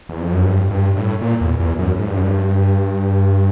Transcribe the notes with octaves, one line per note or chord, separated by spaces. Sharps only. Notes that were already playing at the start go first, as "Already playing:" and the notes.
E2
F2
F#2
G2
G2
A2
A#2
E2
E2
F#2
G#2
G2
F#2
G2